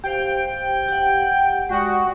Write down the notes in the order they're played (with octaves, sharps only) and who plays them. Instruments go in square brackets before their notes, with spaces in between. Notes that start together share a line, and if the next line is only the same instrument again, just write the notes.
[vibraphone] G4 C5 F5 [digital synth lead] G5
[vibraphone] G4 F#5
[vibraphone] G#3 D5 D#6 [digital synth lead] F#4